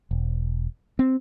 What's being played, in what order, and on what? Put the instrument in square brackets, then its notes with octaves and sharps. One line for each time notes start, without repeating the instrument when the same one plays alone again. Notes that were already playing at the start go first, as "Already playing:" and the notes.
[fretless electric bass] E1
C4